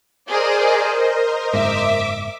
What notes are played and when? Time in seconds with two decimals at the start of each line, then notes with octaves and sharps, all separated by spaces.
0.27 G#4 A#4 C5 D5 D#5
1.54 F#1 G#2 E5 D6